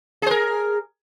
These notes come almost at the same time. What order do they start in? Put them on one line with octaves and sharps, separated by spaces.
G#4 C5 A#4